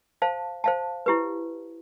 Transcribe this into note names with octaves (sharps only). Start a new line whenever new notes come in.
C5 F5 A5
C5 F5 A5
E4 G4 B4